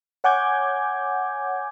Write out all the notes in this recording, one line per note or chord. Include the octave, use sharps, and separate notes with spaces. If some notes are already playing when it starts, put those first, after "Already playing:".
C#5 F#5 G#5 D6 G6 G#6